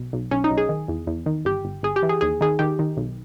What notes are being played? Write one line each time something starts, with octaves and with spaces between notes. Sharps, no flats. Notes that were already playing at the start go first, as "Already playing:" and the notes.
Already playing: B1
B1
B1 C#4
D#4
B1
G#4
D#3
E2
E2
D#3
G1 G4
G1
G1 G#4
G4
E3
G#4
D#2 G#4
D#3 G#4
D#3 G4
D#3
B1